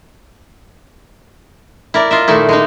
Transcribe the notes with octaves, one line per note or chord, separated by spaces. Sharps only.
E4 A#4 D5
F4 D#5 E5
A#2 D#3 A3 D#4 E4
G#3 A#3 D#4